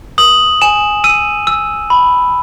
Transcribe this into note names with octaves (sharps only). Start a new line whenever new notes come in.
D#6 F#7
G#5 E7
E6 D#7
E6
B5